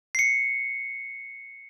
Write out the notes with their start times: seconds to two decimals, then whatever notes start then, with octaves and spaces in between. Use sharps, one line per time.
0.15 C7 C#7